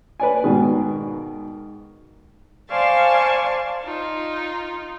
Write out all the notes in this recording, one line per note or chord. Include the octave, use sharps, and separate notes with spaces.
B4 D5 G#5
G#2 B2 D#3
C5 D5 F5 G#5 A5 C#6
D#4 F4